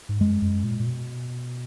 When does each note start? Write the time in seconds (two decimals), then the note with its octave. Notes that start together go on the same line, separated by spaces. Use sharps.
0.09 G#2
0.20 F#2 G#3
0.42 F#2
0.64 A#2
0.80 A#2
0.86 B2